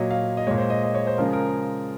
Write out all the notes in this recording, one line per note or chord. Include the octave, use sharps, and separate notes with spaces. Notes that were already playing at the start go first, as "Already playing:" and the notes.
Already playing: A#2 F#3 C#5 D#5
F5
D#5
A#2 G#3 C#5
C5
D#5
D#5
C#5
C5
C#3 F3 G#3 A#4
G#4
A#4